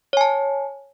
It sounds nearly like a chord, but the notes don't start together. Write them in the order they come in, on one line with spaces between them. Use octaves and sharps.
C#5 G#5 A5